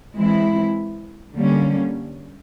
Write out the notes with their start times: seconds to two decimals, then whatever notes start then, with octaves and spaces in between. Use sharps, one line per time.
0.17 E3 G#3 C4 E4
1.34 D3 G3 A#3 C#4